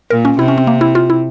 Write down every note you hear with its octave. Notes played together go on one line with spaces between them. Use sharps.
A#2 A#4
C#4
C3 E4
C#4
C4
A#3
E4
F4
E4